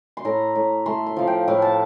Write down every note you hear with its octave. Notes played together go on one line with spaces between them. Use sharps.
C6
A2 A#5
A2
A3 C6
C6
F3 F5
G5
A2 F5
A5